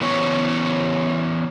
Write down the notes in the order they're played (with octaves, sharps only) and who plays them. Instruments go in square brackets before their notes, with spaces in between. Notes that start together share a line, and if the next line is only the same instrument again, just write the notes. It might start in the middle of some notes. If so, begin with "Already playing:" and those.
[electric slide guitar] E3 B3 C#4 C#5